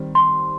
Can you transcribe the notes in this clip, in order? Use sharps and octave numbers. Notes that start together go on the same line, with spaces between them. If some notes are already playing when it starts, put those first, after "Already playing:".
Already playing: D#3 G3 C4
C6